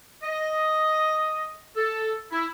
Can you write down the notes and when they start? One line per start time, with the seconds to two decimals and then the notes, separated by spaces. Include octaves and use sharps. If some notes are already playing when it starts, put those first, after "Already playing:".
0.22 D#5
1.76 A4
2.32 E4